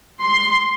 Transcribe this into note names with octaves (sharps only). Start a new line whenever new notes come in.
C6